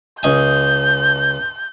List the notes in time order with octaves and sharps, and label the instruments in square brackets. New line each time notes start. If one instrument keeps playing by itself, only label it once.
[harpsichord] C#2 D#5 G#5 [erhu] G6